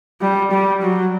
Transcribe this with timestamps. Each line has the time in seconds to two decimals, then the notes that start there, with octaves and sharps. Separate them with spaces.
0.21 G3
0.51 G3
0.81 F#3